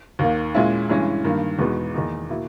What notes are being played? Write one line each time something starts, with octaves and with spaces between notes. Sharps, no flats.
D#2 D#3 A#3
A#2 G#3 C#4 E4
G2 E3 G#3 C#4
G2 D#3 A#3
E2 B2 G#3 B3 D#4
E2 D#3 A#3 D#4
B2 A#3 E4